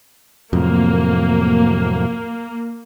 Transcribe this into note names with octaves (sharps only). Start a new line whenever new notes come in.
F2 A2 C3 F#3 A#3